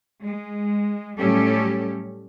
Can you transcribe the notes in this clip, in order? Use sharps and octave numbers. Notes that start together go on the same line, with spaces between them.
G#3
A2 F#3 G3 C#4 G4 A4